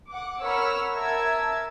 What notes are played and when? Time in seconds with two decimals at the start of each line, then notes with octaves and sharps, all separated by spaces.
0.10 F#5 D6
0.42 A#4 C#5 F#5 B5 E6 F6
0.97 A#4 E5 A5 E6 G#6